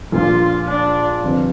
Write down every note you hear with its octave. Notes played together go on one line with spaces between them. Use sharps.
A#1 A#2 A#3 D4 F4
D4
G1 F2 C3